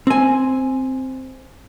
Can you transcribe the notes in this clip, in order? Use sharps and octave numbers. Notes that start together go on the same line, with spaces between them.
C4 G#5